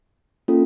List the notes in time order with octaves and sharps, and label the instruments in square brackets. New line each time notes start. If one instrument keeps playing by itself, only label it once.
[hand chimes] A#3 C#4 F4 A4